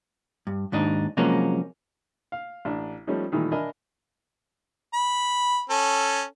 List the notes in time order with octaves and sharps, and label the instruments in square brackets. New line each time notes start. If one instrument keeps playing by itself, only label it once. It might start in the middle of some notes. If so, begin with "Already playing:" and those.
[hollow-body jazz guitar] G2
D#2 G#2 D4 D#4
C3 F3 F#3 G#3 A#3 C#4
[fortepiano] F5
A1 D4
F3 G3 A3 C#4 D#4
A#2 D#3 E3 G3 A3 D#4
D4 A#4 D#5 E5 G#5 B5
[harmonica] B5
C#4 A4